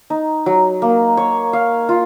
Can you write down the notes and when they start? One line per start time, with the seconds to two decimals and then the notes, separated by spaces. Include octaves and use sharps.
0.10 D#4
0.46 F#3
0.82 A#3
1.17 C#5
1.53 F5
1.89 F4